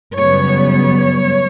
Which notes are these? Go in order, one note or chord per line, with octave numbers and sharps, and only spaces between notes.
F#2 C#3 G3 B3 C#5
C#5